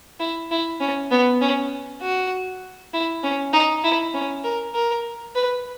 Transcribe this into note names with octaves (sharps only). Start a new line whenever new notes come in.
E4
E4
C#4
B3
C#4
F#4
E4
C#4
D#4
E4
C#4
A#4
A#4
B4